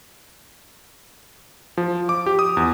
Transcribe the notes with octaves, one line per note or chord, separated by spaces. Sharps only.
F3
D6
G4
D#6
E2